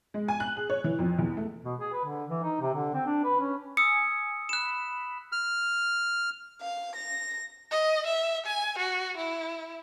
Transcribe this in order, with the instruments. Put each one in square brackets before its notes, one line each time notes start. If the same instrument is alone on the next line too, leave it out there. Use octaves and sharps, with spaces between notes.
[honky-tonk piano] G#3
G#5
F#6
G#4
C#5
E3
F2
E2
A3
[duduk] B2
G#4
B4
D3
E3
D#4
C3
D3
C4
D4
B4
C#4
[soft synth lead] G#5 [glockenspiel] D#6 E6 [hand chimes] C#7
[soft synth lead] B5 [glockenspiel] F#6 E7
[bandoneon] F6
[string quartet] F5
A#6
[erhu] D#5
E5
G#5
F#4
E4